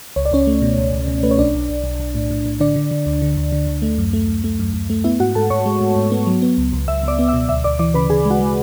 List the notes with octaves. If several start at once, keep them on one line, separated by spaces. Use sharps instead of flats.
C#2 C#5
D5
C#2 C#4 C#5
A3
B2
C#2
C#2
B2
A3 B4
C#5
B1 D4 D5
B1
B1
B1
B1
A2
A2
A2
D3 D4 D5
D3
D3
D2
D3
D2
D3
D2
A3
F#2
A3
F#2
A3
F#2
F#2
A3
B3 E4 E5
G#2 F#4 F#5
G#2 A4 A5
G#2 C#5 C#6
G#3
G#2
G#2
B3
F#3
B3
C#2
C#2
C#2 E5 E6
C#2 D5 D6
B3
E5 E6
B2
D2 E5 E6
D2 D5 D6
E3 D5 D6
C#3 B4 B5
C#3 G#4 G#5
G#3
F#4 F#5
G#3